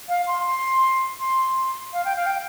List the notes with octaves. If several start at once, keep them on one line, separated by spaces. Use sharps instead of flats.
F5
C6
C6
C6
F5
G5
F5
G5